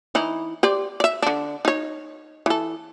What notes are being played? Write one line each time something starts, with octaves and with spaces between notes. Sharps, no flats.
E3 D#4 E4
G4 C5 D5
D5 E5
D3 D4
D#4 C#5
E3 A4